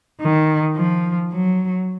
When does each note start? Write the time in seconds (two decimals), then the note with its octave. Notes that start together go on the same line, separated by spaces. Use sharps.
0.21 D#3
0.76 F3
1.32 F#3